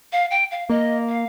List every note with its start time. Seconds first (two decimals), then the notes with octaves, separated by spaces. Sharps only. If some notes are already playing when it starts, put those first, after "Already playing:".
0.12 F5
0.31 G5
0.51 F5
0.69 A#3 D#5
1.09 F5